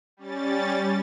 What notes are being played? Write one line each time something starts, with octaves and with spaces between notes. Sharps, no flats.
G3 C#4 A6